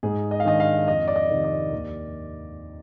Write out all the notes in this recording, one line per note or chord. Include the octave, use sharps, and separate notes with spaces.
G#2 G#4
D#5
F5
D#3 G#3 D4 D#5
F5
F2 D#5
D5
D#5
C3 D#3
D5
D#2